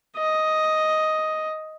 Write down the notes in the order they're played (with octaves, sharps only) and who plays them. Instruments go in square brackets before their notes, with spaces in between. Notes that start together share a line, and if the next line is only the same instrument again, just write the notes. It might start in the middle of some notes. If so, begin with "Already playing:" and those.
[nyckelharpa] D#5